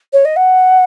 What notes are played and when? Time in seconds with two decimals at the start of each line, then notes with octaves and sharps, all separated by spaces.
0.13 C#5
0.25 D#5
0.36 F#5